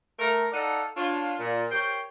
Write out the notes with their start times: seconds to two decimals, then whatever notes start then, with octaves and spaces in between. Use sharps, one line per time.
0.19 A3 A#4
0.52 D#4 A4 D5 F5 F#5
0.97 D4 F4 C#5
1.39 A#2
1.71 G4 A#4 C5 C#5 G5